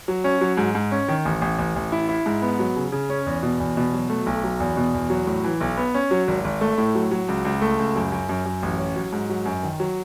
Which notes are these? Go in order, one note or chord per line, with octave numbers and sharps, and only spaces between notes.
F#3
C#4
F#3
G#2
G#2
C#4
D#3
A1
A1
A1
A1
E4
E4
G#2
B3
F#3
C#3
C#3
C#4
E2
B2
E2
B2
F#3
A3
B1
F#3
E2
B2
E2
F#3
A2
E3
B1
B3
C#4
F#3
G#1
G#1
A3
A2
F#3
F#3
C#2
C#2
A3
C#2
F#2
F#2
F#2
F#2
A1
C#4
F#3
G#2
F#3
F#2
D#3
F#3